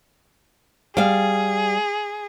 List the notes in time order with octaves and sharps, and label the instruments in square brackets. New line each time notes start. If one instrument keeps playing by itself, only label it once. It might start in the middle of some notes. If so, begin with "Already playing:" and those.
[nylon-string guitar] G3 F5 [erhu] G#4